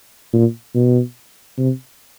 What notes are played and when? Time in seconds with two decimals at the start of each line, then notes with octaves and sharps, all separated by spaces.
0.33 A#2
0.75 B2
1.58 C3